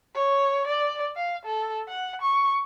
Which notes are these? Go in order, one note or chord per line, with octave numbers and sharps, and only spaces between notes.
C#5
D5
F5
A4
F#5
C#6